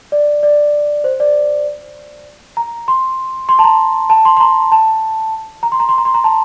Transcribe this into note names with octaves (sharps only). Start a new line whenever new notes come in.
D5
D5
C5
D5
A#5
C6
C6
A5
A#5
A5
C6
C6
A#5
A5
A#5
C6
A#5
C6
A#5
C6
A#5
A5